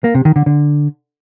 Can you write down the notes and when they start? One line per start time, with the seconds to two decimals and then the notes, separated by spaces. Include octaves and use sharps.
0.04 A#3
0.15 C3
0.25 D#3
0.36 D3
0.46 D3